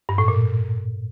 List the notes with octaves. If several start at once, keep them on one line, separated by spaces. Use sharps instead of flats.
G2
A2
A#2